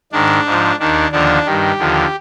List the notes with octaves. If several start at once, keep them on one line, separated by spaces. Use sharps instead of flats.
G#2 D#3 D4
G#2 F3
D#2 D#3 D4
D#2 D3 F3 D4
G2 D#3 G4
D#2 D3 F3